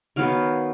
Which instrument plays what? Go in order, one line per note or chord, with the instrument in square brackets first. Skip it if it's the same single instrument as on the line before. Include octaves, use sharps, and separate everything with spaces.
[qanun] D#3 F#3 B3 F5